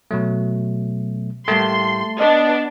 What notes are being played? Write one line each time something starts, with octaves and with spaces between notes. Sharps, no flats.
B2 F#3 A3
A2 G3 A3 A#3 A5 C6
B3 D4 D#5